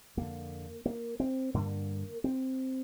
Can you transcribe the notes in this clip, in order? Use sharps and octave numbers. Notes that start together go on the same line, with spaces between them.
F2 D3 A#3
A#3
C4
G2 D3 A#3
C4